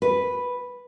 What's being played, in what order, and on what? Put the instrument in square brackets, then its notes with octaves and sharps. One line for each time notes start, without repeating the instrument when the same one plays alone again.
[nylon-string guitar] B4